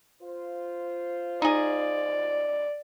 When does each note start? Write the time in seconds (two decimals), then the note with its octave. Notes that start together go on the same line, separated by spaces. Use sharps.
0.22 F4 C5
1.42 D#4 G#4 D5